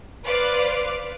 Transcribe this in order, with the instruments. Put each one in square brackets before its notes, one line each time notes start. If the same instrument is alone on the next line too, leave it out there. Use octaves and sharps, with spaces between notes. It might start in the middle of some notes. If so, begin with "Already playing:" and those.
[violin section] B4 C5 D5 F5